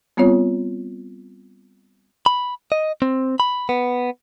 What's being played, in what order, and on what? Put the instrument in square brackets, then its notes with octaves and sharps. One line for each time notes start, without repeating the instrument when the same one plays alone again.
[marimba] G3 B3 C4 F4 C#5
[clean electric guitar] B5
D#5
C4
B5
B3